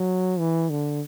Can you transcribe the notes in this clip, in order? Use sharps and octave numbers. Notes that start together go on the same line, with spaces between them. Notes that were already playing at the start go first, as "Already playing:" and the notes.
Already playing: F#3
E3
D3